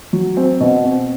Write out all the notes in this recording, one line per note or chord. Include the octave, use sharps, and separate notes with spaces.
F#3
C4
B2
C4